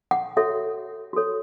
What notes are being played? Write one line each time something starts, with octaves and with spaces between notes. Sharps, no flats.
F#5
F#4 A4 C#5 E5
F#4 A4 C#5